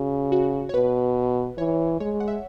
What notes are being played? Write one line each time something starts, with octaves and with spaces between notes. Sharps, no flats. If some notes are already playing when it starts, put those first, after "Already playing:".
Already playing: C#3 F#4
F#4
C#5
B2 B4
E3 C#5
G#3 C#5
F#5
E5